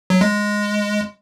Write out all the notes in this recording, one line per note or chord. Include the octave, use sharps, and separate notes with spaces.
F#3
G#3